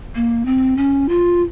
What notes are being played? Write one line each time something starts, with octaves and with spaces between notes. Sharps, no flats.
A#3
C4
C#4
F4